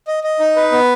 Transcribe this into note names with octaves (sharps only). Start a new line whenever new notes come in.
D#5
D#5
D#4
B4
B3